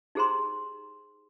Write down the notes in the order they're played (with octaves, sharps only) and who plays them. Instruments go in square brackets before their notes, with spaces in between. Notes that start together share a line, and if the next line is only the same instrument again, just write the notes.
[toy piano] D#4 G4 G#4 C5 A#5 C6